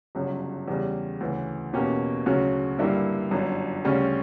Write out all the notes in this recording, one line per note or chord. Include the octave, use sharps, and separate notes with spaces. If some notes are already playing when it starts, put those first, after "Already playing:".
G1 F#2 C#3
E2 C#3 G3
D2 C#3 E3
E2 B2 A#3 C#4 G4
D2 C#3 F#3 C#4 F#4
G2 D3 G3 A#3 E4
G1 F#2 D3
D2 C#3 G3 C#4